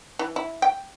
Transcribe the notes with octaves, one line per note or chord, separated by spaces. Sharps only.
E3
E4
G5